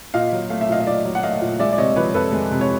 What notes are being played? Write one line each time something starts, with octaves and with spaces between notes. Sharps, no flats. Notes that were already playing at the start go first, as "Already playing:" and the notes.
A#2 D#5 F5
F#3
A3 F5
E5
A#2 D#5 F5
D#5
A#2 D5 E5
F#3
F#5
A3 D#5 F5
A#2
G#3 D5 E5
D5
C3 C#5 D#5
F3 B4 C#5
F2 A4 B4
G#3
C3
C#5